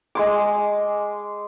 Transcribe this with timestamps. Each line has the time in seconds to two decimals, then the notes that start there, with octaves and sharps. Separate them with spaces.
0.15 G#3 C6 D6